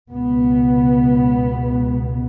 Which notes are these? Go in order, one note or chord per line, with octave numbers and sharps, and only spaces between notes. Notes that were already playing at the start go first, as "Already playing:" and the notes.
C#2 B2 B3